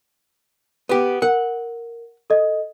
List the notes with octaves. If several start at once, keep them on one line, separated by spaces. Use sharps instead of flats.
B3 G4
A#4 F#5
A4 D#5